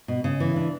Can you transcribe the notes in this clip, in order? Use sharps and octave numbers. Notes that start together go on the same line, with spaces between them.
B2
C#3
E3
D4